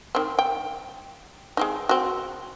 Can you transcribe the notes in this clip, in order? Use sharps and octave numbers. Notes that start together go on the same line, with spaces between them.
D#3 C4
G5
G#3 C4 D#4
C4 F#4